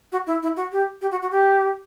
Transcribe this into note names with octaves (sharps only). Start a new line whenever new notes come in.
F#4
E4
E4
F#4
G4
G4
F#4
F#4
G4